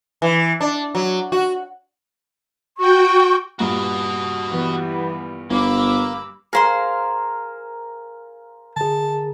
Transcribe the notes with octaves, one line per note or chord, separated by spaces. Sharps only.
E3
D4
F#3
F#4
F#4 G5 C#6
G2 A#2 F#4 D#5
E3 G3 B3
G1 A#3 B5 D6 E6
G#4 A#4 C5 F5 C6
D3 G#4 A5